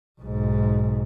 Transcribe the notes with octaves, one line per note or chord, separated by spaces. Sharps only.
B1 G#2